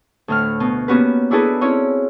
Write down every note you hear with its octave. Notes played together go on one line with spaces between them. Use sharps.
D2 A2 F6
B2
A#3 B3 C#4 F#4 G4 B4
D4 E4 F#4 G#4 A4 B4
C4 C#4 E4 C#5